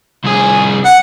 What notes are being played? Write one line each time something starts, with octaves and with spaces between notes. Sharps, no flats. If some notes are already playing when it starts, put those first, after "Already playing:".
C2 G#4
F#5